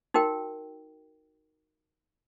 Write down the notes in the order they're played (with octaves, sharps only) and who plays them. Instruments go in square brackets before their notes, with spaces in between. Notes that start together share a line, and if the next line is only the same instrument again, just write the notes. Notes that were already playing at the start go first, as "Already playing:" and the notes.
[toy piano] D#4 F#4 A#4 G5